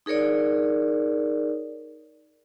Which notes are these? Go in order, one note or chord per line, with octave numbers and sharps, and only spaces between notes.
D#4 G#4 A#4 C#5 D5